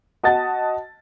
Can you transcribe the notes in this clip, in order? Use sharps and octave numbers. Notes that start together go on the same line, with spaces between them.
F#4 D#5 F#5 A5 A6